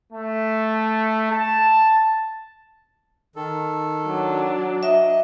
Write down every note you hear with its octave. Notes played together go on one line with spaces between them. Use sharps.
A3
A5
D#3 A4
F#3 D4
D#5 E5